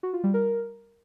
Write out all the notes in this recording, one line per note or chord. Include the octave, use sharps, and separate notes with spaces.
F#4
F4
G3
A#4